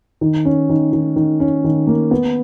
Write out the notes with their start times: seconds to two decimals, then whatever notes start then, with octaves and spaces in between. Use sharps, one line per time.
0.21 D#3
0.45 C#4
0.69 D#3
0.93 D#3
1.16 D#3
1.40 C#4
1.64 D#3
1.87 A#3
2.11 B3